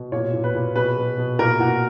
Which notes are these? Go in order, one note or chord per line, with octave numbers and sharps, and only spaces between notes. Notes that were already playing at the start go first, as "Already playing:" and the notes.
Already playing: B2
A#2 C#5
A#2
B4
A#2
B2 B4
B2
B2
A#2 A#4
A#2 F#4